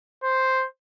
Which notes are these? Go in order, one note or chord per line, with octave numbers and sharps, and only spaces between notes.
C5